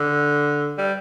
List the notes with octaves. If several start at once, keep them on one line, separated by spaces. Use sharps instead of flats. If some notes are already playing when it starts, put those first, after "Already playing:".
Already playing: D3
G3